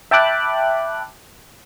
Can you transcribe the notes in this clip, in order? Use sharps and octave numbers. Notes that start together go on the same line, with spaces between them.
E5 G5 A5 B5 D6 F#6